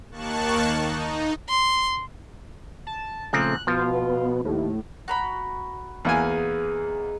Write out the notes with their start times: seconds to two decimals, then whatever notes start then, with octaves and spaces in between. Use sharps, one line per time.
0.11 D#2 D#3 A#3 A5 C#6 F#6
0.72 D#4
1.49 C6
2.87 A5
3.33 A#2 C#3 F3 A3 C4 F#6
3.67 B2 F3 B3 F4
4.45 D#2 A2
5.08 F#4 A#5 B5
6.05 E2 A#3 D#4 G#4 B4 G#5